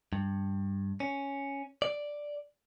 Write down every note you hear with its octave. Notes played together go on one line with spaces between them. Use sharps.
G2
C#4
D5